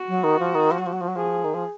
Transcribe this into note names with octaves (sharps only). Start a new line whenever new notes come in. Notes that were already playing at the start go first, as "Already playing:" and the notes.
Already playing: F#4
F#3
D#3
F3
D#3
F3
F#3
F3
F#3
F3
F#3
F3 G#4
D#3
F3